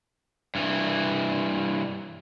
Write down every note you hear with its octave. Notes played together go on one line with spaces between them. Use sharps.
G2 E3